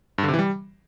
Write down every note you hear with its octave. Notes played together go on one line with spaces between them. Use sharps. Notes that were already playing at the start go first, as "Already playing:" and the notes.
G2
D3
C3
E3
G3